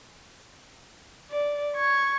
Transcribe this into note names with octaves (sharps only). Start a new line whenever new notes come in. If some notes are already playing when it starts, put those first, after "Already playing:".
D5
C#6 G#6